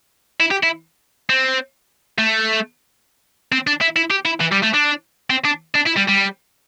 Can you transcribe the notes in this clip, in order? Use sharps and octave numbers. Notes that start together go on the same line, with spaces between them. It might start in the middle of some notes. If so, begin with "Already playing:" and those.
E4
G4
E4
C4
A3
C4
D4
E4
E4
G4
E4
E3
G3
A3
D4
C4
D4
D4
E4
G3
G3